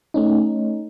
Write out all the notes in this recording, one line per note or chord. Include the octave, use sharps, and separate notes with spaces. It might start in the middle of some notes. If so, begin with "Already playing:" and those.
A3 C#4 D#4